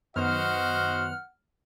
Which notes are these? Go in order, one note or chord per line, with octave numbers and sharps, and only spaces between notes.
F#2 D#3 B3 F#4 C5 D#5 F#5 F6